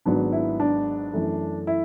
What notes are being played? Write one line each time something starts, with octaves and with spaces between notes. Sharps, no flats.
G#1 G#2 F#3 B3 D4
E4
D4
F#2 E3 A3
E4